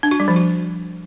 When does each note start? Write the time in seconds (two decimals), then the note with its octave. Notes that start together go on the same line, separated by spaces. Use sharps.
0.03 D4
0.11 F#4
0.20 G3
0.28 F3
0.36 F#4